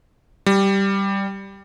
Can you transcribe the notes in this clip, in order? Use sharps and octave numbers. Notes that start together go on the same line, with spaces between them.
G3